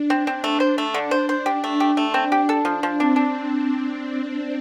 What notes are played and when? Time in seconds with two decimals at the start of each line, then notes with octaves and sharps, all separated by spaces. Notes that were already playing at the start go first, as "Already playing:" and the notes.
Already playing: D4
0.10 C4
0.27 C4
0.44 A3
0.60 C5
0.78 A3
0.94 D3 D4
1.11 C5
1.29 C5
1.46 G4
1.64 A3
1.80 G4
1.97 A3
2.14 C4
2.32 G4
2.48 D4 A4
2.65 F3
2.83 F3
2.99 C4 D4
3.16 D4